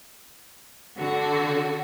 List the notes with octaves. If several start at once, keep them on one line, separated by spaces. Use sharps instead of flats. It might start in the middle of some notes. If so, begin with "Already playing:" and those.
D3 F#4